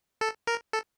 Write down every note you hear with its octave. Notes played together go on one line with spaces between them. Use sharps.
A4
A#4
A4